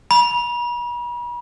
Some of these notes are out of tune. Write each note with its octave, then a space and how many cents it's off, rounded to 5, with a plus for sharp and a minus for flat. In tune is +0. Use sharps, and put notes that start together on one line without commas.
B5 -40